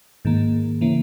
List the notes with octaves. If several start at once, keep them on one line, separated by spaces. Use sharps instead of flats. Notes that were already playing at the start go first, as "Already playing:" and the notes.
G#2 D#3 A#3
C#3 E3 A#3